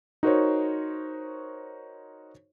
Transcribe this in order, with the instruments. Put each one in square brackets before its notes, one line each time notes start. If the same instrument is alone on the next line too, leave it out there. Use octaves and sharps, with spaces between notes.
[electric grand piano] D#4 F#4 A#4 C5 C#5